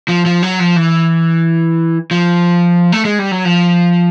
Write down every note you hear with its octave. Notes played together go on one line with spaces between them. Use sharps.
F3
F3
F#3
F3
E3
F3
A3
G#3
G3
F#3
F3